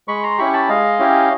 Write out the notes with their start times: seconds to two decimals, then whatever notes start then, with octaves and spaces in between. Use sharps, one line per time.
0.08 G#3 B5 C#6
0.23 A#5 C6
0.38 C#4 E4 G4 B5 C#6
0.53 A5 B5
0.69 G#3 D#5 F5
0.99 C#4 E4 G4